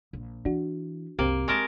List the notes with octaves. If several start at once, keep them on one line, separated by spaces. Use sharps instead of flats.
A#1
E3 D4 F#4
C2 F#2 A#3 C4 G4
G#3 C4 A#4 A5 C#6